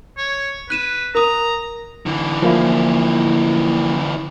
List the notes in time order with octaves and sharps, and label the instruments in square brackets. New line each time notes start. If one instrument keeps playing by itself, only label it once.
[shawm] C#5
[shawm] B4 [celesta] F#6 D#7 E7
[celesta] A#4 D#6 [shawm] A#5
[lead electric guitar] D3 E3
[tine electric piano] F3 A#3 E4